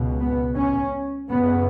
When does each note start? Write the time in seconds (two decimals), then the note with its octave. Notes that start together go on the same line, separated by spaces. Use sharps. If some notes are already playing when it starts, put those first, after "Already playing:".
Already playing: C#2 B2
0.20 B3
0.55 C#4
1.28 F#2 C#3 B3